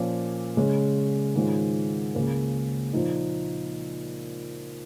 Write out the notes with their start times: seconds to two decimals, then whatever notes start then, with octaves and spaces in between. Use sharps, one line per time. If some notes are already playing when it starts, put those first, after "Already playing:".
Already playing: A#2 F3 A#3 C#4
0.57 C#3 G#3 C#4
1.35 G#2 D#3 G#3 C#4 F4
2.14 C#2 C#3 A#3
2.93 A#2 F3 A#3 D#4